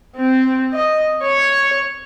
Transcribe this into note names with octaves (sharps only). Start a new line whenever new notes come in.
C4
D#5
C#5